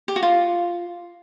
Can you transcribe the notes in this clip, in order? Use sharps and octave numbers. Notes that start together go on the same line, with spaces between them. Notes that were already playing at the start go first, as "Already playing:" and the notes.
G4
F#4
F4